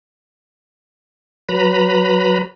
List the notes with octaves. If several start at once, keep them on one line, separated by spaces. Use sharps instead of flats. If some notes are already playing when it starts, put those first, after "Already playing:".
F#3 B4 A#5 B5